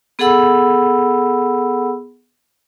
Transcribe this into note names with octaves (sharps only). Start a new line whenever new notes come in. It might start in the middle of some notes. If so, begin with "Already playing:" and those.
B3 G#4 A4 F#5 B5 E6